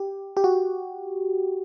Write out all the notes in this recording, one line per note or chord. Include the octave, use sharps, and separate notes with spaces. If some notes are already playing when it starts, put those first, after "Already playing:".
Already playing: G4
G4
F#4